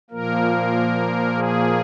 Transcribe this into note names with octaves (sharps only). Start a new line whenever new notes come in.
A#2 F3 A#3 A#4
G#4